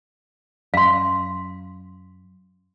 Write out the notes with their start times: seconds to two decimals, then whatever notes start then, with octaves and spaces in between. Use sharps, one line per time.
0.74 F#2 F5 C6